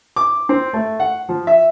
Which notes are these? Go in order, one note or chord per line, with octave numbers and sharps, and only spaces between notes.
D6
C4
A3
F#5
F3
E5